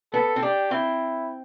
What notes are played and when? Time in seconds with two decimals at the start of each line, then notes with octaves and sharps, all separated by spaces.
0.13 B3 A4
0.36 C4
0.43 D4 G4
0.71 C4 E4